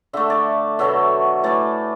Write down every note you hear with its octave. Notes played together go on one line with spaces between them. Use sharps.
D3 A3 E5
D5
B2 F#3 A3 E5
A2 E3 A3 D5